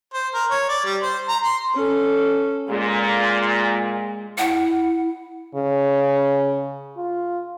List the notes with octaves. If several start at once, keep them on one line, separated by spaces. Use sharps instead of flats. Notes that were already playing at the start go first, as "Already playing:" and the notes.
C5
A#4
C#5
D5
G3
C5
A#5
C6
C#4 A4
A#2 G#3
E4 F#5
C#3
F4